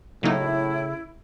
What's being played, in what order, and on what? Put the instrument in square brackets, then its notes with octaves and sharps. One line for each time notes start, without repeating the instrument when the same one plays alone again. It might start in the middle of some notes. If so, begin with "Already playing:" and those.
[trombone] A2 [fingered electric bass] C#3 [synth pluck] F#3 A#3 D#4 [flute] E4